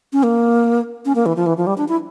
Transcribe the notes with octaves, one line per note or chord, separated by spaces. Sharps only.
C#4
A#3
C#4
A#3
E3
F3
E3
F3
G3
D4
E4